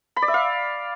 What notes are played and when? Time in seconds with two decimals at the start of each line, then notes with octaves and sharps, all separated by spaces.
0.16 B5
0.22 D5
0.28 E5
0.34 F5